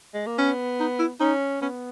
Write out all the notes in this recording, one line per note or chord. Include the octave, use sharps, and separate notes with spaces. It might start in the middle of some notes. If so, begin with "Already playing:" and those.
G#3
A#3
B3 C#4
D#4
E4
C#4 D#4
B3 C#4